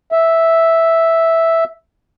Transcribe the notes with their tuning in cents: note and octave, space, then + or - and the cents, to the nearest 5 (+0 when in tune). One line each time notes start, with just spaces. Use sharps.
E5 -5